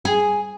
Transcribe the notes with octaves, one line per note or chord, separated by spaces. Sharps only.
G#4